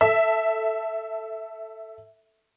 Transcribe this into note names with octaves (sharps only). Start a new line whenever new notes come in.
A4 E5